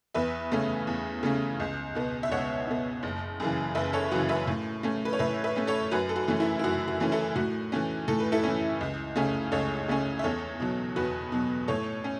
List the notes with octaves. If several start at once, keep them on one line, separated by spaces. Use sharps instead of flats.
E2 B4 E5
C#3 A3 C#4
E2
C#3 A3 C#4
C#2
B2 B3
E5
C#2 C#5 F#5
B2 B3
F#1
F#2 C#3 E3
F#1 B4 E5
A4 C#5
F#2 C#3 E3 F#4 B4
B4 E5
A2
A3 C#4
B4
C#5
A2 B4 E5
B4 E5
A3 C#4
A4 C#5
F#2 F#4 B4
A4
F#4
E3 A3 C#4
E4
E4
F#2 F#4
F#4
E3 A3 C#4
E4 A4
A2 F#4
E3 A3 C#4
A2 A4
B4
E4 A4
E3 A3 C#4
C#2
C#3 A3 C#4
C#2 A4 C#5
C#3 A3 C#4
E5
E2 A4 C#5
B2 F#3
E2 F#4 B4
B2 F#3
A2 A4 C#5
C#4